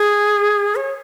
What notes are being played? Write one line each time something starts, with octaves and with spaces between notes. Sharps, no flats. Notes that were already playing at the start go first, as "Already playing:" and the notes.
Already playing: G#4
C#5